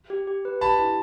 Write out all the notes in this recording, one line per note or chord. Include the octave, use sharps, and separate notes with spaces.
G4
G4
B4
G4 A5 B5
E4